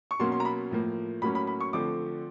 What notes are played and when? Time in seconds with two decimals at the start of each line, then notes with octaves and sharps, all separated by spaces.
0.11 C#6
0.19 B2 F#3 A#3 C#4 C6
0.32 C6
0.40 A#5
0.45 B5
0.71 A2 F3 A#3
1.22 A2 F#3 A#3 C#4 B5
1.35 B5
1.47 B5
1.61 C#6
1.73 D3 F3 A3 C4 D6